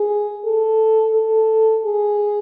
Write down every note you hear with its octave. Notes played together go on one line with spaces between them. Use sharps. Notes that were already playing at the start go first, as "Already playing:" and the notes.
Already playing: G#4
A4
A4
G#4